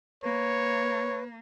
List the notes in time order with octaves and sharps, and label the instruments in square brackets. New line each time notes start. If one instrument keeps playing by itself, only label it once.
[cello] A#3 [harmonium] B4 [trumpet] C#5